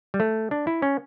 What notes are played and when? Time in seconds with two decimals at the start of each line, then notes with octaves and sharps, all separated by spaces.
0.14 G3
0.20 A3
0.51 D4
0.67 E4
0.82 C#4